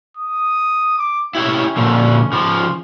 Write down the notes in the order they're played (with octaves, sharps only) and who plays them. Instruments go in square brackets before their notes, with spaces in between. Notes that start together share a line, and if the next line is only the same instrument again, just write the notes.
[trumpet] D#6
D6
[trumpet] C#4 [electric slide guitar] E4 G4 C#5
[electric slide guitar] A#2 D3 F3
C#3 F3